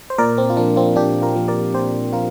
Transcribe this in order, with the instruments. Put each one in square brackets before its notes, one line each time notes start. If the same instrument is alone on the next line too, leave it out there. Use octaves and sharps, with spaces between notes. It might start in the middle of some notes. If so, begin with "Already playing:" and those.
[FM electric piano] C5
A#2 A#4 D5
C4
F4
F3 A#3 D4
C4 F4
A#2 D4 G4
F4 A#4
F3 A#3
A#4 D5
A#2 G4 C5
F3 F4 A#4